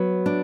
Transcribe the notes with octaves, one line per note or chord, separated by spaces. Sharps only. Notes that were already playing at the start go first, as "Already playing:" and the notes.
Already playing: F#3 B3
D4